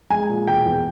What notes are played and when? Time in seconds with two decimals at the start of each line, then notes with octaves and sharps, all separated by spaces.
0.10 G#3 G#5
0.29 A#2
0.47 E1 G5
0.66 E2